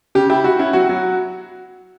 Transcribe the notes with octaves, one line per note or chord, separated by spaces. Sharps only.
C#3 G4
E4 G4
E4 F#4
C#4 E4
F#3 F#4
F#3